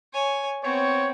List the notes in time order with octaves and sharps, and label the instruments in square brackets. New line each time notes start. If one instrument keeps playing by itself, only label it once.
[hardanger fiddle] C#5 G#5
[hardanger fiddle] B3 C4 [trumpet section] C#5